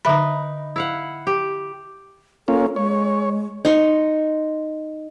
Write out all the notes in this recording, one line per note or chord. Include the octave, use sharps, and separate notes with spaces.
D3 D#4 B4 E5 B5
E4 F5 F#5
G4
A#3 C#4 F4 A4
G#3 C#5
D#4 C6 C#6